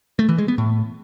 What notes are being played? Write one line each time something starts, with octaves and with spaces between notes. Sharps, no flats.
A3
E3
G#3
B3
A2